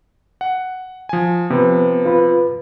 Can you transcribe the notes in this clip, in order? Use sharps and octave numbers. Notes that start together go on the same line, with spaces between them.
F#5
F3 G#5
C3 F3 B3 B4
F4 B4